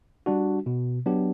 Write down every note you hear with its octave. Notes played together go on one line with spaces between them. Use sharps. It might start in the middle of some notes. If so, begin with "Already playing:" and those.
G3 D4 F#4
B2
F#3 B3 D4 G4